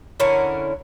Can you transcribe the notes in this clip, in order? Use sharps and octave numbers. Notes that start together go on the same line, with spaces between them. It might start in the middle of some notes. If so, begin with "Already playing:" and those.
D3 C#4 E4 A#4